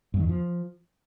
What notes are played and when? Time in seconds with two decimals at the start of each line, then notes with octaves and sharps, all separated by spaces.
0.14 G2
0.19 D#3
0.24 E2
0.29 F3